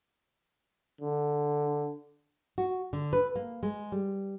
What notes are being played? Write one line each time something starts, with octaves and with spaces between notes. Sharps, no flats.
D3
F#4
D3
B4
A#3
G#3
G3